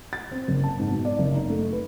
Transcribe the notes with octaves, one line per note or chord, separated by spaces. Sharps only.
A6
C4
F#1
A5
G#2
B2
D5
F#1
D#4
A3
B4